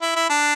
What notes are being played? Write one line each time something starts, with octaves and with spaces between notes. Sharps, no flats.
E4
E4
D4